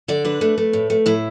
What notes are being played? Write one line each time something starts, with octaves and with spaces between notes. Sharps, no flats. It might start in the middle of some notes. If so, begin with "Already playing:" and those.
D3 D5
D4 B4
A3
A3
A2
A3
A2 E4